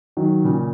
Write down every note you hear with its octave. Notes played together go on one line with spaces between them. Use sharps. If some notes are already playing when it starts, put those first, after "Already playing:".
D#3 F#3
A#2 C#3